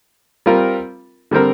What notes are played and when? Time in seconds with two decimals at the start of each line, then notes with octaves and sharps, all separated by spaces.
0.46 G3 C4 F4 A#4
1.31 D3 G3 C4 A#4